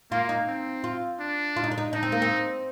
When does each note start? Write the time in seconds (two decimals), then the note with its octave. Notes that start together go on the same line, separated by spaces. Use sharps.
0.11 A#3 F4
0.29 D#4
0.48 C4
0.84 F4
1.20 D4
1.56 F4
1.64 D#4
1.71 D4
1.78 D#4
1.93 D4 D#4
2.03 C4
2.12 A#3
2.22 C4